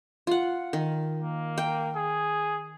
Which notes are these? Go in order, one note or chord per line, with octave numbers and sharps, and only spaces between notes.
F4 F#5
D#3
A#3
G5
G#4